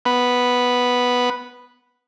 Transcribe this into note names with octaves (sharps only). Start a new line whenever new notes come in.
B3 B5